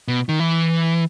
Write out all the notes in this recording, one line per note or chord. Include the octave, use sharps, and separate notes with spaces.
B2
D#3
E3